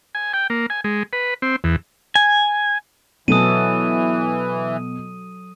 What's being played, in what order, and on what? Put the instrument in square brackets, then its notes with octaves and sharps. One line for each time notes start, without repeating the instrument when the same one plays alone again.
[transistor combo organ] G#5
G5
A#3
G#5
G#3
B4
C4
E2
[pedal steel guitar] G#5
[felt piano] B2 [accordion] E3 [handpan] F#3 A4 [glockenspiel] D#6 D#7